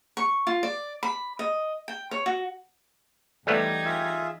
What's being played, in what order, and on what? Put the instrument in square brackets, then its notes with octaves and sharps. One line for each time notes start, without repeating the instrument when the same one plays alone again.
[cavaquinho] C#6
F4
D5
B5
D#5
G5
C#5
F#4
[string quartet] E2 D#4 G#6 [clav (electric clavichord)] G3 A3 B3 [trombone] G4
[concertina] F4 G#4 E5